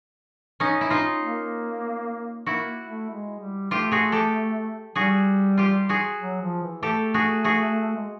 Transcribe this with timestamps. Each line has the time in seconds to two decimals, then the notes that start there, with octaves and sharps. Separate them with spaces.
0.60 C#4 D#4
0.81 E4
0.90 D#4 F4
1.22 A#3
2.46 A#3 E4 F#4
2.88 A3
3.09 G#3
3.40 G3
3.71 A3 F4 G4
3.91 F#4 G#4
4.12 G4 A4
4.95 G3 F#4 G#4
5.58 F4 G4
5.89 F#4 G#4
6.21 F#3
6.42 F3
6.63 E3
6.82 A3 G4 A4
7.14 F#4 G#4
7.44 F#4 G#4
7.96 G#3